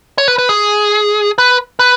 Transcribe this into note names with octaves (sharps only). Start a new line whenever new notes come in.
C#5
B4
B4
G#4
B4
B4